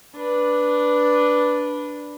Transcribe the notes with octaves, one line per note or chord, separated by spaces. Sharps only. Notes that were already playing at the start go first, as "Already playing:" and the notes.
D4 B4